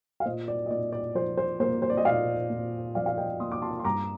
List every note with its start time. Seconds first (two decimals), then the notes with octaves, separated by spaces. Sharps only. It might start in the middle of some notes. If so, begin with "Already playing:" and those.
0.20 F5
0.25 A#2 C5 D#5
0.48 D5
0.66 D#5
0.71 A#2 D5
0.93 D5
1.15 F3 C5
1.37 C5
1.60 A#3 C5
1.82 C5
1.90 D5
1.97 D#5
2.05 A#2 D5 F5
2.50 A#2
2.95 F3 D5 F5
3.06 F5
3.17 D#5 G5
3.40 A#3 C6 D#6
3.52 D6
3.62 A5 C6
3.79 C6
3.84 G2 A#5 D6